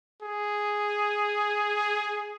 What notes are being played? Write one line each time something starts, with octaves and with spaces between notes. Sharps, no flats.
G#4